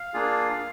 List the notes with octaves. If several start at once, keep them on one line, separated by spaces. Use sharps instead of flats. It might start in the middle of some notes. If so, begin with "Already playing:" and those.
Already playing: F5
A#3 D4 F4 G#4